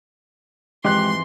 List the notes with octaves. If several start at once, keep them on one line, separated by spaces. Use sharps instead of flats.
F2 G#2 E3 G#3 G4 C6 F#6